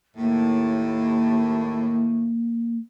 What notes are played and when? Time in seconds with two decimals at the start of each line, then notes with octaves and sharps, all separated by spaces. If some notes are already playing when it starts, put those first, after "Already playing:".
0.16 D#2 A2 A#3